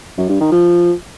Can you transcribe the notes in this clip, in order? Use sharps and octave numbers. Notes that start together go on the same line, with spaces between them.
F#2
G2
D#3
F3